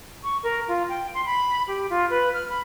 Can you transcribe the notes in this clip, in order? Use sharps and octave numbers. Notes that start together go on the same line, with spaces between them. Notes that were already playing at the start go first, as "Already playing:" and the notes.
C#6
A#4
F4
G5
C6
B5
G4
F4
B4
F6
B5